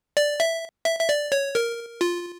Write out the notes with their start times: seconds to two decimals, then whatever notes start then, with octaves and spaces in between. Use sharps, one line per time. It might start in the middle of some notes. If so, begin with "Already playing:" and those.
0.17 D5
0.40 E5
0.85 E5
0.99 E5
1.09 D5
1.32 C#5
1.55 A#4
2.01 F4